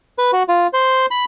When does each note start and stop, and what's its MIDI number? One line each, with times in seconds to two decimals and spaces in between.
0.18 0.31 71
0.33 0.43 66
0.48 0.67 65
0.73 1.06 72
1.11 1.25 83